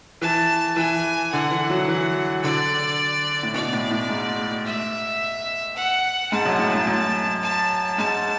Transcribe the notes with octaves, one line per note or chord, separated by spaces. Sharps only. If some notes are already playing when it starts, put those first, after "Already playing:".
E3 A5
E3 G#5
D3 F#5
E3
F#3
E3
D3 D5
A2
B2 D5
A2
A2
G#2
E5
F#5
G#2 A5
F#2
A2
G#2
F#2
A5
G#2 A5